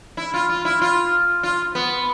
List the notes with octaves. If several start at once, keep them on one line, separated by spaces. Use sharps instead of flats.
E4
F4
F4
E4
F4
F4
B3